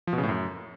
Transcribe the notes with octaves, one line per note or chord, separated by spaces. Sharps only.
F3
B2
C#3
A2
F#2